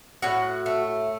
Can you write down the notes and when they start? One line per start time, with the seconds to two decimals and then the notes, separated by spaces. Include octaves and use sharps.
0.22 A2 F#4 F#5
0.66 A3